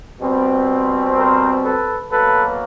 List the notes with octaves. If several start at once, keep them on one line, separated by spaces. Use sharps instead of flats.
B2 G3 C4
A#4 C5
A4 B4
B2 F#3 A#3 A4 B4